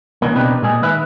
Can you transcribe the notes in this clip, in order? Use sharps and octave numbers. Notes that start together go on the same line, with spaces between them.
C#3 E3 A#3
B2 C4 D4 D#4 G4 B4
A#2 G#3 G#4
D#3 B4 E5